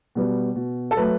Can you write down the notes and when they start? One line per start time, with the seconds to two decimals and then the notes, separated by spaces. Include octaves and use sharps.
0.15 B2 G3 B3
0.56 B2
0.91 A4
0.97 F#3 A3 B4